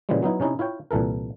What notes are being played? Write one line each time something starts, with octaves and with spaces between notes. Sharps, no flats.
A#2 C#3 E3 F3 G3 G#3
F#3 B3 D#4 E4
C3 C#4 D#4 E4 D#5
E4 F4 C#5 G5
C2 A#2 E3 A4 A#4